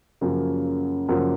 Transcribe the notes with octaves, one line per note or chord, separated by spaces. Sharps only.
F#2 C#3 F3 A#3
F#2 C#3 F3 A#3